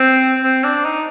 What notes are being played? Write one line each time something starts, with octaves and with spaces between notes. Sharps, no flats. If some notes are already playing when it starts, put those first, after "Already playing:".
Already playing: C4
C4
D4
D#4